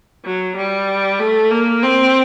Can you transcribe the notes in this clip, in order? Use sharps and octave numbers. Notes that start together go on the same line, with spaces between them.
F#3
G3
A3
A#3
C4